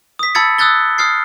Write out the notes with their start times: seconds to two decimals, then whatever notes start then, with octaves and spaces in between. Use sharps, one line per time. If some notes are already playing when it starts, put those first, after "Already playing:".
0.19 D#6 B6
0.35 A5 B5 E6 G#6 A6 C#7
0.58 D#6 E6 F#6 G#6 A6 G7
0.98 D#6 F6 G#6 C7